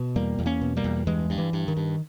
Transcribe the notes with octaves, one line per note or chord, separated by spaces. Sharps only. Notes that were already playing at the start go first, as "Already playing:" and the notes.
Already playing: B2
E2 G3 A#3
E2
A#3 C#4
B2
G3 A#3
E2
G2 E3 G#3
G2
E3
G2
D#3
G2